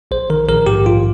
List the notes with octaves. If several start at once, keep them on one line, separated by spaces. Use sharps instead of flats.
A#1 C5
D#3 A#4
A#1 A#4
G#2 G4
A#1 F4